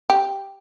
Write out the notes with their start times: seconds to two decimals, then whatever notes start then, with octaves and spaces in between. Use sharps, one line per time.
0.10 G4